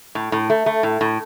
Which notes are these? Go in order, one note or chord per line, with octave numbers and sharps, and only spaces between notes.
A2
A2
A3
A3
A2
A2